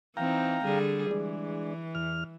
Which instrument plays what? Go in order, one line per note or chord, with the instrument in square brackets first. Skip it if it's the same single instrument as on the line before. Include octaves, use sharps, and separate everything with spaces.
[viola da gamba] E3 C4 D#4 [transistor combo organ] F5 G5 A#5
[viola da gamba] D3 G3 G#4
[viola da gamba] E3 [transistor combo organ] G#3 D4
[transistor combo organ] E2 F6